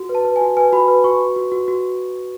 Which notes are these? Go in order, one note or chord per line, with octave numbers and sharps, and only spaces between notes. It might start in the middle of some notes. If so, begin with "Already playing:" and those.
Already playing: F#4
B4
A5
B4
G#5
F#4
B4 G#5
F#4 B5
B4
F#4 C#6
F#4
F#4
F#4
F#4